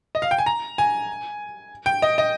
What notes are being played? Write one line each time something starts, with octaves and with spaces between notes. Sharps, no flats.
D#5
F5
G5
G#5
A#5
G#5
G5
D#5
D#5